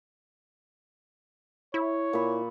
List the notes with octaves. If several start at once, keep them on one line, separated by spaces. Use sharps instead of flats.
E4 C#5
A#2 B5 C#6